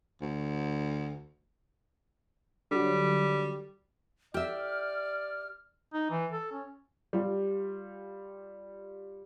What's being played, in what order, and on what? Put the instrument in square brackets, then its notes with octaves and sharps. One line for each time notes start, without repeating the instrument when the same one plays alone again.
[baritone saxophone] D2
[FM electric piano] D3 F#3 [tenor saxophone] G3
[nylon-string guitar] G4 E5 [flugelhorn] D5 [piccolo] F6
[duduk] D#4
E3
A4
C#4
[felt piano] G3 F4 G4